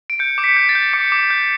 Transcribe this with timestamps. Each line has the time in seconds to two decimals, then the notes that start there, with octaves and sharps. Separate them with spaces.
0.10 D7
0.19 G6 C#7
0.38 D6 C#7
0.44 B6
0.56 G6
0.69 A6
0.75 G6
0.93 D6 C#7
1.12 D6
1.30 G6